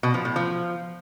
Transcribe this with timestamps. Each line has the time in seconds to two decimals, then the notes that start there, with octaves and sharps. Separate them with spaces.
0.03 B2
0.14 F3
0.25 A2
0.36 F3